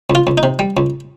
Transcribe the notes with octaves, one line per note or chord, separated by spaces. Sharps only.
C#2
F4
C#2
D#4
C3
G3
C#2